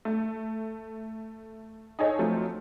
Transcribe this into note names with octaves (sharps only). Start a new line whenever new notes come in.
A3
D#4 G#4 A4 C#5 D#5
F3 F#3 A3 C4